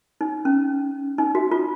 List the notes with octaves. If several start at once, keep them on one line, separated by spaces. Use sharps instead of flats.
D#4
C#4
D#4
F#4
F4